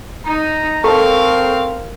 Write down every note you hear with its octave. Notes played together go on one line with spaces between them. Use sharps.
D#4 A#5
C4 A4 A#4 F5 C#6